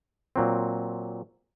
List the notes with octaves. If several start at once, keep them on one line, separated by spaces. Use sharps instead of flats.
A#2 F#3 C4